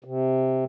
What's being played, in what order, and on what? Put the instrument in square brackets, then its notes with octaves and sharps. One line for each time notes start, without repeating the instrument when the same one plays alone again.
[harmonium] C3